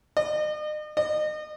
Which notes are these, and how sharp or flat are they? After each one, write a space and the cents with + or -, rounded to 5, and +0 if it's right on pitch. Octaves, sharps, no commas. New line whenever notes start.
D#5 -40
D#5 -35